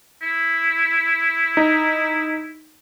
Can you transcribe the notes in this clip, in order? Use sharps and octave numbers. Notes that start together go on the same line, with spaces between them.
E4
D#4